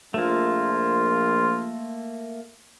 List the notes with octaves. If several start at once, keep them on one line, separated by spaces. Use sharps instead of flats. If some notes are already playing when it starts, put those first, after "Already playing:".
A#1 F3 A3 A#3 F4